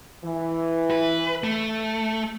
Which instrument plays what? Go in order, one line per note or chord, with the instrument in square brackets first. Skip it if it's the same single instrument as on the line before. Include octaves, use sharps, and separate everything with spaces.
[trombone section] E3
[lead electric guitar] B4
A3